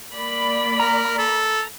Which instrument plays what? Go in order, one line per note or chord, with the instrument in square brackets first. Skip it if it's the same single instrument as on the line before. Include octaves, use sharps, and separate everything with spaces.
[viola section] A#3 D5 B5
[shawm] A#4 [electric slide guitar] A#5
[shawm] A4